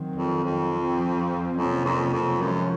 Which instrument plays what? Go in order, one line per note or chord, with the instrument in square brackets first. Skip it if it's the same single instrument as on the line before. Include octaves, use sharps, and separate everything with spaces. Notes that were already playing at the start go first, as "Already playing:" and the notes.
Already playing: [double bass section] D#3 F#3 C4
[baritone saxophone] F2
F2
[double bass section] F3 C4
[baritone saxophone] F2 [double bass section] C3 D#3 F#3 A#3 C#4
[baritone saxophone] F2
F2
[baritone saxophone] F#2 [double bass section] F3 G#3 C#4